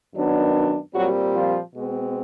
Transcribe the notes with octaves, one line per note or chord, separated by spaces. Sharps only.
F#2 D#3 F#3 B3 D4
A#2 F#3 G3 C4 F#4
F3 F4
B2 G#3 C4